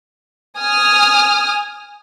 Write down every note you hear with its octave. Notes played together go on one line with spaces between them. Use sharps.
G#5 D#6 F6